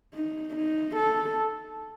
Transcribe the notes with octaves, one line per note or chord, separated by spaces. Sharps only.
D#4
D#4
A4